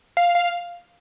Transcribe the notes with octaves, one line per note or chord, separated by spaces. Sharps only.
F5
F5